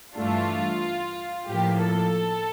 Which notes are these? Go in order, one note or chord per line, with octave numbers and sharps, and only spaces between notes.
G2 E3 A3 D4 F4
A2 F3 A#3 G4
A4